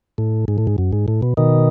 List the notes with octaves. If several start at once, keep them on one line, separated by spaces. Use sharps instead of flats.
A2
G#2
A2
G#2
F#2
G#2
A2
B2
B2 D#3